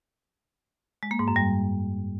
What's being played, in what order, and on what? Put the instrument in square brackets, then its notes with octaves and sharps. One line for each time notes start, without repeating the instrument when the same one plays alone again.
[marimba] G#3
A#3
G#2
F#2
G3